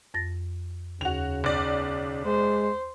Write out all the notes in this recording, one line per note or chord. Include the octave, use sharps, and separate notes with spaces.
F2 A6 A#6
D#2 C#3 F#4 F7
B1 D5
G#3 C5